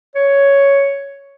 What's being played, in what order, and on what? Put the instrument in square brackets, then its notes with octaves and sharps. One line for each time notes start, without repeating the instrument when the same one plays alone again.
[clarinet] C#5